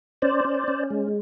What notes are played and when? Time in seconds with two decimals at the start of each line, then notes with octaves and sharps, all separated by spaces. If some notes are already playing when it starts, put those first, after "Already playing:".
0.22 C#4 C5 D5
0.45 C#4
0.68 C#4
0.90 G#3